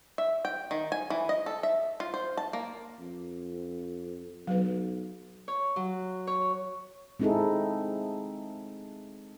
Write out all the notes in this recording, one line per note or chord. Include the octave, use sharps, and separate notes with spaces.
E5
G5
D#3
G#5
E3
D#5
A4
E5
F4
C5
A5
A#3
F2
B1 F#3 B4
C#5
F#3
C#5
G#3 C4 D#4 E4 G#4 A4